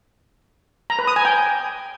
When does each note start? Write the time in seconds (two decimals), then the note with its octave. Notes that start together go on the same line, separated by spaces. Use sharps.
0.90 A#5
0.99 B4
1.07 D#6
1.16 G#5
1.25 G5